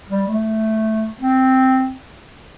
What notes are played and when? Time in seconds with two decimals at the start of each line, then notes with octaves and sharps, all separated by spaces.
0.09 G3
0.28 A3
1.20 C4